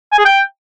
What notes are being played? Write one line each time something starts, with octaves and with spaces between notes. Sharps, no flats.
G#5
G#4
G5